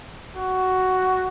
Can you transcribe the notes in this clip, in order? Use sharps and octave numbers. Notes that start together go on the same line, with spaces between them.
F#4